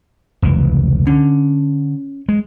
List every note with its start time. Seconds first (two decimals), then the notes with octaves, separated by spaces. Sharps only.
0.42 F1 C#2 E3
1.07 D3 C#4
2.29 G#3